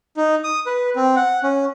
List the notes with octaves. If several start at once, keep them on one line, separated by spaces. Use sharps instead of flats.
D#4
D#6
B4
C4
F#5
C#4